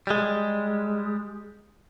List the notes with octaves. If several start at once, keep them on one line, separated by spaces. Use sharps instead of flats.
G3 G#3